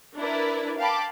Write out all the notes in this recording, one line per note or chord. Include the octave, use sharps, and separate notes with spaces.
D4 E4 A#4 B4 D5
F5 G5 A5 B5 D6